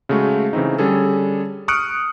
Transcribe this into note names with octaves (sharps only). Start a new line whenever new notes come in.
C#3 G#3 A3 F#4
C#3 E3 A3 C4 D#4
D3 G3 C#4 G#4 A4
C#6 D#6 F6 F#6 C#7 D7